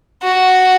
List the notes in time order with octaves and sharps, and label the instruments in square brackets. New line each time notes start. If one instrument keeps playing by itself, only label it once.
[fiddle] F#4